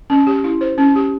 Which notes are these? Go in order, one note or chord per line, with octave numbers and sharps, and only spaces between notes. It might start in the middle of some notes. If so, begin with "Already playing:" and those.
C#4
G4
E4
C5
C#4
G4